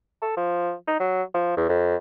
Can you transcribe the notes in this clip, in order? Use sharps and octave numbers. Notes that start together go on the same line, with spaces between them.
A4
F3
D#4
F#3
F3
E2
F2